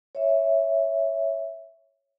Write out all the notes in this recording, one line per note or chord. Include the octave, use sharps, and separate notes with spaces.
C#5 E5